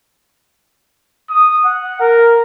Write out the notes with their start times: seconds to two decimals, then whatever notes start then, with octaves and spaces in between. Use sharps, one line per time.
1.30 D#6
1.65 F#5
2.00 A#4